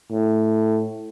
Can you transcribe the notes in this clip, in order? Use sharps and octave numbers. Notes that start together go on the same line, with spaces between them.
A2